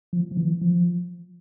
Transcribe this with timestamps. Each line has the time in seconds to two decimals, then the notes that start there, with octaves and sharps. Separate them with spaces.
0.13 F3
0.31 F3
0.37 E3
0.61 F3